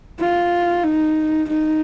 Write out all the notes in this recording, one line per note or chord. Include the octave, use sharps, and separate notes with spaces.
F4
D#4
D#4